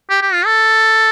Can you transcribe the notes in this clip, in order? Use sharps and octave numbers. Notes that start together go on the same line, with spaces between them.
G4
G4
F4
A4